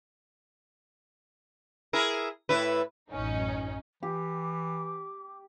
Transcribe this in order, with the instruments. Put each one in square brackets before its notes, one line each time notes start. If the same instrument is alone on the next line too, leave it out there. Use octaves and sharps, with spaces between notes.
[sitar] E4 G#4 A#4
A2 E4 B4
[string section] A1 F#2 C#4 D#4
[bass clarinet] E3 [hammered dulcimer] G4 [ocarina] D6